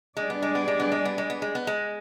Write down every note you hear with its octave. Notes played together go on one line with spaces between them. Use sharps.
G3 G#3 D4 G#4 D5
B3
G#3
B3
G#3
B3
G#3
B3
G#3
B3
G#3
B3
G#3